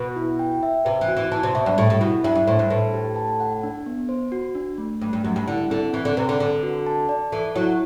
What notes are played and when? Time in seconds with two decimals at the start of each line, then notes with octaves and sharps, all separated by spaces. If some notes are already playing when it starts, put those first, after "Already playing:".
Already playing: B2 B4
0.16 E4
0.39 G5
0.63 E5
0.85 C3 B4
1.01 E3
1.08 F#4
1.17 E3
1.32 E3 A5
1.43 C3
1.55 B2 E5
1.66 G2
1.78 A2 G4
1.90 A2
2.01 B2 E4
2.24 G2 E5
2.35 G2
2.47 A2 C5
2.59 G2
2.70 A2 B4
2.94 G4
3.16 A5
3.40 F#5
3.63 D4
3.86 B3
4.09 C5
4.32 F#4
4.55 D4
4.78 A3
5.01 G2 A3
5.13 G2
5.24 F#2 G4
5.36 G2
5.47 D3 E4
5.70 D3 C4
5.93 E3 C4
6.05 D3
6.17 C3 B4
6.29 D3
6.40 D3 A4
6.63 F#4
6.87 A5
7.09 D5
7.32 E3 A4
7.56 F#3 E4